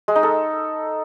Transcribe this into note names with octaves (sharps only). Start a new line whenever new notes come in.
G#3
D#4
A4